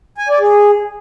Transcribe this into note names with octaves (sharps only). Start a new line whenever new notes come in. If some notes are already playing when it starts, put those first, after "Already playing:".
G#5
D5
G#4